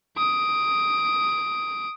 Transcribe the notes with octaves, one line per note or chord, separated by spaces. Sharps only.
D#6 D7